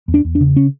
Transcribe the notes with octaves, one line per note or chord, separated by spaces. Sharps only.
E2
D4
E2
D4
C#3
C#4